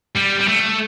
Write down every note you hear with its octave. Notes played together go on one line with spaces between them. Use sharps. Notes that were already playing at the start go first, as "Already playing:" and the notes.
G3
G3
A3